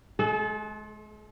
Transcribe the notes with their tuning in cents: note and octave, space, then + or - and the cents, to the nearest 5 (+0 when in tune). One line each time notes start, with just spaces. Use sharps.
G#3 +35 A4 -30